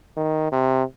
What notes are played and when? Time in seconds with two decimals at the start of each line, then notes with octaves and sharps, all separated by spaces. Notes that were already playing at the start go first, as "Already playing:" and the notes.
0.17 D#3
0.52 C3